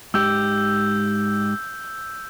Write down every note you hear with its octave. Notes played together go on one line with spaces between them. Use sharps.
G#2 G4 E6 G6